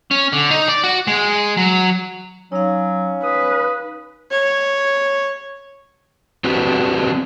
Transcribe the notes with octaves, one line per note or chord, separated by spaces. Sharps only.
C#4
D3
D#4
D5
F#4
G#3
F#3
F#3 C#4 D#4 F5
B4 D#6
C#5
C4 D4 F#4 G4 B4